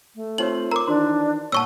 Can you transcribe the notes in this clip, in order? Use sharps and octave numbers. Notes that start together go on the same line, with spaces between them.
A3
C4 D#4 F4 G4 C5 C#5 F#7
A#4 A#5 C6 D6
D#3 E3 D4 F#4 C5 C6
A#2 C#5 F#5 A5 C#6 D#6 E6